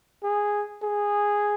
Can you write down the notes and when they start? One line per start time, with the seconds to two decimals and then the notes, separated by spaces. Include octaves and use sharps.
0.23 G#4
0.82 G#4